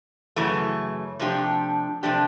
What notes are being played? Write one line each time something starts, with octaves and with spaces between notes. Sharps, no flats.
F#2 C#3 E3 A3
C3 F3 A3 D4 G4
C3 F3 A3 D4 G4